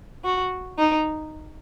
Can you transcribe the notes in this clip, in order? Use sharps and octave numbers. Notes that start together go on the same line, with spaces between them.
F#4
D#4